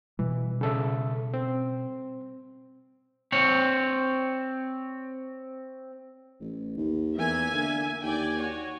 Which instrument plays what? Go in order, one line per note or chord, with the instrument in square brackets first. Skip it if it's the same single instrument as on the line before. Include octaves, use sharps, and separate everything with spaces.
[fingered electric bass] B2 G3 [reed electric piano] E3
[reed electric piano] C#3 A4 E5
C4
[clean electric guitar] C4 C#5
[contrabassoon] A1
D#2
[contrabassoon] E2 [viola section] A#3 E5 G#5
[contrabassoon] D3
[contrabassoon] D#2 [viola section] D5 G5 G#5
[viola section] F#4 C#5